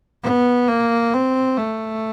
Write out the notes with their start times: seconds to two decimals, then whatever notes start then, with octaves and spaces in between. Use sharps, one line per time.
0.23 B3
0.68 A#3
1.13 C4
1.57 A3